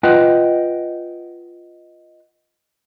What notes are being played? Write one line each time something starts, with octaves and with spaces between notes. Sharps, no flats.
F4 B4 D#5 F#5 G5